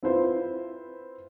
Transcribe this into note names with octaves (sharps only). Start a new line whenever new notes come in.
C4 E4 F4 B4 C5